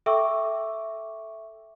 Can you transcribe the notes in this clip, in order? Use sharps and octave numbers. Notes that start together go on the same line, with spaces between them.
A4 E5 G5 C#6 D6 E6